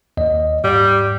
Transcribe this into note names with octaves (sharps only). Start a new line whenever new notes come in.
D#2 D#5
G#2 G3